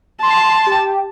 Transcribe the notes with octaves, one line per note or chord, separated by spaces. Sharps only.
A5 C6
G4